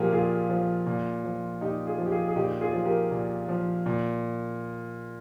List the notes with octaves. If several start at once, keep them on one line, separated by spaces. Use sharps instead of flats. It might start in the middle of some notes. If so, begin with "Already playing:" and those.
Already playing: A#2 F3 G4 G#4 A#4
A#2 F4 G#4
F3
A#2
F3
A#2 D#4 G4
F4 G#4
F3
G4
F4 G#4
G#4
A#2 D#4 G4
F4 G#4
F3
G4 A#4
A#2
F3
A#2